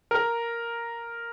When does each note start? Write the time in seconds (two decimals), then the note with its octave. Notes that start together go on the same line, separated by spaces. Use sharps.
0.11 A#4